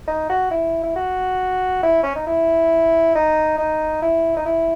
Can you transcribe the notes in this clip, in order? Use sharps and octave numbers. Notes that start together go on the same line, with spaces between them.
D#4
F#4
E4
E4
F#4
E4
C#4
D#4
E4
D#4
D#4
E4
D#4
E4